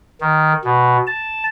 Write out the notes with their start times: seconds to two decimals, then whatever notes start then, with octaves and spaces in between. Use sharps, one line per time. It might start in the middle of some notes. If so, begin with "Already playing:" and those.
0.21 D#3
0.64 B2
1.07 A5